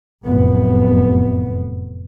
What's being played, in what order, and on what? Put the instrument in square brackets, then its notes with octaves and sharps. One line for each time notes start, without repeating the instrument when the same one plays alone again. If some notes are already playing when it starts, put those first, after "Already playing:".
[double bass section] F1 F#2 A2 B3